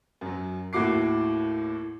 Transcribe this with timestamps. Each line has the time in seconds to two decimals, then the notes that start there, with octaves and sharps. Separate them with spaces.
0.21 F#2 F#3
0.73 D#2 A2 E4 F#4 D6 C7